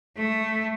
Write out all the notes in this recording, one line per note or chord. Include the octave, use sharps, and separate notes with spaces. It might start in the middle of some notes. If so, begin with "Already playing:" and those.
A3